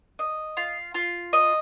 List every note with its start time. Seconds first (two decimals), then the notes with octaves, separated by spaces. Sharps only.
0.19 D#5
0.57 F4
0.94 F4
1.33 D#5